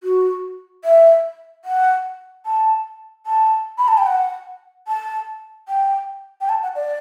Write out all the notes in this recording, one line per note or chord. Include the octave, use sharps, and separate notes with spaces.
F#4
E5
F#5
A5
A5
B5
A5
G5
F#5
A5
G5
G5
A5
F#5
D5